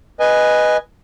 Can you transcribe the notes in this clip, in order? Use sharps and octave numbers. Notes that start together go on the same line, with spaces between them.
B4 D#5 G#5